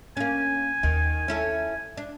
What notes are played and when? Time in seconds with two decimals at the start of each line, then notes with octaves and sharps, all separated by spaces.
0.17 A#3 C#4 G#5
0.83 D#2 D#3
1.28 C#4 E4 A4
1.97 D4